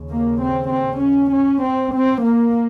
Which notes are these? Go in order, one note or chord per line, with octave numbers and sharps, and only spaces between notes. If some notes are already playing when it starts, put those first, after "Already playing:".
Already playing: D#2 C#3
A#3
C4
C4
C#4
C#4
C4
C4
A#3